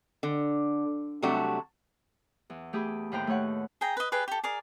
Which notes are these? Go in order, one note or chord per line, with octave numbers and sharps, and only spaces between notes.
D3
C3 F#3 G3 A3 D4 F#4
E2
A3 G4 G#4 B5
D#2 A2 B4 C5 G5 A#5
A3 D#4 C#5 F#5
G#4 G5 A#5
B4 D#5
G4 G#4 B4 D5
G4 A4
G#4 A#4 D5